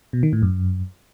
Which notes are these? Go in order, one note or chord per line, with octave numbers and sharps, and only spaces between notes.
B2
D#3
A2
F#2